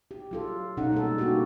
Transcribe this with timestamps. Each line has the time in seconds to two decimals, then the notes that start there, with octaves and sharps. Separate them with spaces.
0.11 G4
0.31 F#3 F4 A4
0.77 B2 C#4 D#4 A4 F#5
0.92 G3 G#3 A#3 A4
1.18 A#3 D4 D#4 F#4 G4